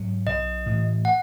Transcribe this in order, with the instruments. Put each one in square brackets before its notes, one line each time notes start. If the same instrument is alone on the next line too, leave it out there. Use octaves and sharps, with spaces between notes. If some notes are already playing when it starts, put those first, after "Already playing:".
Already playing: [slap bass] G#2 F#3
[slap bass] B1 [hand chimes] D#5
[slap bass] A2 E3 A3
[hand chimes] F#5